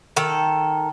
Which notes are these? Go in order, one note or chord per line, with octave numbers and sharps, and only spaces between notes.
D#3 A4